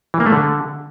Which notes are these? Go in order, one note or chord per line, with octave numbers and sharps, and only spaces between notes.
E3
A#3
A3
D3